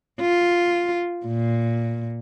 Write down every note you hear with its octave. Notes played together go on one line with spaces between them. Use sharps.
F4
A#2